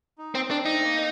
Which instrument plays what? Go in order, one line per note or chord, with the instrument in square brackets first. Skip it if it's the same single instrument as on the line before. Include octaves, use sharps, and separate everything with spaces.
[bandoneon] D#4
[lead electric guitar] C4
[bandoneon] C4 [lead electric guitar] D4
[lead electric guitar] D#4
[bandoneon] A3
A#3